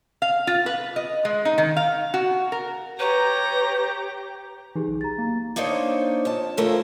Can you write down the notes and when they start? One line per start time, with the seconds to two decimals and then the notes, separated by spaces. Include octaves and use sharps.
0.22 F5
0.47 F4
0.66 B4
0.96 D#5
1.25 G#3
1.45 D#4
1.58 D#3
1.77 F5
2.14 F#4
2.52 A#4
2.99 G4 B4 C#5 A#5
4.75 E3 D#4 G4 G#4
4.88 B1
5.01 A#5 A6
5.18 A#3
5.56 A#3 D4 D#4 C5 C#5
6.25 F2 A5
6.57 C#3 F3 A3 E4 A#4 C5